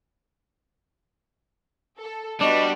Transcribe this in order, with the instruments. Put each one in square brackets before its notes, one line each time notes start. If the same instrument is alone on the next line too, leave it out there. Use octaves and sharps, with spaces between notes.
[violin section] A4
[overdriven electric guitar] G3 [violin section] B3 F#4 [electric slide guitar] D4 [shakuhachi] D#5